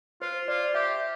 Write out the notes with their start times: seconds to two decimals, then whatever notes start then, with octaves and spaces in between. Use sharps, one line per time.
0.22 F4 C5
0.48 F4 D5
0.74 G4 E5